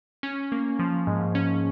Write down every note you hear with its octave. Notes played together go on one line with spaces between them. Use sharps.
C#4
A#3
F3
G#2
C#4